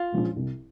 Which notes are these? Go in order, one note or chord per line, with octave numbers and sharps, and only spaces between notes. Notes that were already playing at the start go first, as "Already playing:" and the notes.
Already playing: F4
A#2 F3 G#3 C#4
C2